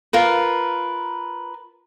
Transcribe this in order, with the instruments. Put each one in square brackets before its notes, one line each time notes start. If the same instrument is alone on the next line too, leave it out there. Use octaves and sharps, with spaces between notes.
[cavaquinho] F4 A#4 B4